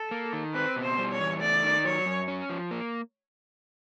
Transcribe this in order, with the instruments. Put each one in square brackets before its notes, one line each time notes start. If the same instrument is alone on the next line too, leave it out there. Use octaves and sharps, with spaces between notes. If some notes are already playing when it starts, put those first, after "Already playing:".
Already playing: [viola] A4
[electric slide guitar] A#3
D#3
[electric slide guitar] C4 [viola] B4
[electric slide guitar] B2
[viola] C5
[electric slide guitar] G3
[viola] C#5
[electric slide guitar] E2
[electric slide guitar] A3 [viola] D5
[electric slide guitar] D#3
[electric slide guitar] F#3 [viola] C#5
[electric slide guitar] F#2
C#4
F3
A#3